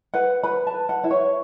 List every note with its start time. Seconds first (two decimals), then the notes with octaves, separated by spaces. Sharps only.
0.14 B4 F#5
0.43 B4 B5
0.67 A5
0.74 B4
0.89 F#5
1.04 E4 E5
1.11 C#5